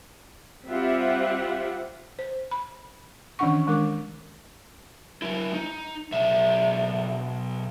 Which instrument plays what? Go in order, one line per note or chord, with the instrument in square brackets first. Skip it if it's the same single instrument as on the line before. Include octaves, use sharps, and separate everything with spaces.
[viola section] G3 C4 F4 G4 E5 F#5
[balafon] C5
B5
D#3 E3 C#4 D4 F#5 C#6
D#3 G#3 D4 A#4 D6
[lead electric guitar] F#3 E4
D#4
B1 E5